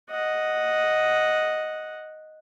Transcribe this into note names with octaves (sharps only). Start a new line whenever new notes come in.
D#5 F#5